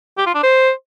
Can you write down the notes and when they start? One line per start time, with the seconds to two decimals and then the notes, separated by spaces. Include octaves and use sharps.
0.18 G4
0.26 F4
0.35 D4
0.43 C5